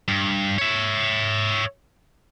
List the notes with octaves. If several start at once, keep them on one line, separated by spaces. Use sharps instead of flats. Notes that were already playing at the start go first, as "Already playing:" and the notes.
G2
C#5 E5